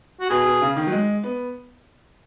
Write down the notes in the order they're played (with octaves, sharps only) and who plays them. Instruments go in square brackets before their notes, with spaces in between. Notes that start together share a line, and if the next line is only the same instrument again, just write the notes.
[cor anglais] F#4
[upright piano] B2 [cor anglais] G#4
[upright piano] B2
C#3
D#3
F#3
G#3
B3